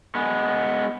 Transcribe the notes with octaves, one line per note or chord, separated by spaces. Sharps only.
G#3 B3